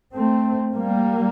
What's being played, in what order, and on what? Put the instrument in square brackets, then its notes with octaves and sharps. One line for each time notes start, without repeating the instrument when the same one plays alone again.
[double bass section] A3 C4
G3 A#3